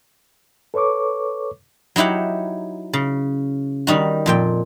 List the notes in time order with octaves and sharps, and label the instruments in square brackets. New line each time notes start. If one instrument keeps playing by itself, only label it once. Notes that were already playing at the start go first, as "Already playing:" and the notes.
[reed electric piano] A4 B4 C#5 C#6 D6
[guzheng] F#3 D#4 E4 G4 F#5
C#3
D#3 G3 D#4 F#4
F2 A#2 G5